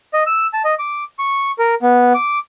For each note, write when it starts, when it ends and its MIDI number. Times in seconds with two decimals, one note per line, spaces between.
0.14 0.23 75
0.27 0.47 88
0.53 0.62 81
0.65 0.74 75
0.79 1.04 86
1.19 1.51 85
1.59 1.75 70
1.82 2.13 59
2.14 2.39 86